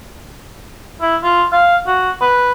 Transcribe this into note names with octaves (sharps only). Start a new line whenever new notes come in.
E4
F4
F5
F#4
B4